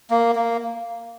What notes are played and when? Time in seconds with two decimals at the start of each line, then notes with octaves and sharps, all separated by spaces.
0.10 A#3
0.36 A#3